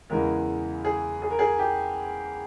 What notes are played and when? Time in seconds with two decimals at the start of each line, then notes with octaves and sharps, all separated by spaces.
0.10 E2 C#3 E3 G#3 A#4
0.85 G#4
1.22 G#4
1.30 A#4
1.39 G#4
1.59 G4